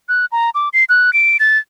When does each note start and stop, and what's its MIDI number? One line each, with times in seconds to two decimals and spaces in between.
0.09 0.26 90
0.32 0.50 82
0.55 0.69 86
0.73 0.84 96
0.89 1.13 90
1.13 1.37 98
1.40 1.58 93